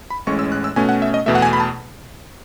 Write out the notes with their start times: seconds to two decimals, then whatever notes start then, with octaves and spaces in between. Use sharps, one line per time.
0.10 B5
0.27 A1 A2 G#3 C#4 C#6
0.39 E6
0.52 F#6
0.64 E6
0.76 B2 A3 C#4 G#5
0.89 F#5
1.02 E5
1.14 D#5
1.26 E2 B2 A3 E5
1.35 F#5
1.42 G#5
1.53 B5
1.60 A5